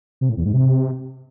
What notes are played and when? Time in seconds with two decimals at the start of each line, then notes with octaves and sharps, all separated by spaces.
0.21 C3
0.29 A2
0.37 E2
0.45 G#2
0.53 C3